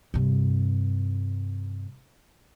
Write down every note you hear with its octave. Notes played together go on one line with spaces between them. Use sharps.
G2 C3